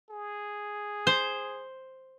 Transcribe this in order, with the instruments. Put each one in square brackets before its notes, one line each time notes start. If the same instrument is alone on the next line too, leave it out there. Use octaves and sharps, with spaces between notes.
[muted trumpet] G#4
[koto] C5